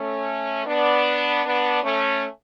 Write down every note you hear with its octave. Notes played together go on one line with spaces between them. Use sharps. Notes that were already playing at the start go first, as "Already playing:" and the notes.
Already playing: A3 C#4
B3 D4
B3 D4
A3 C#4